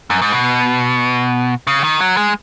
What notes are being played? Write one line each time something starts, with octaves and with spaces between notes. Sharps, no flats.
F#2
G#2
B2
C#3
D#3
F#3
G#3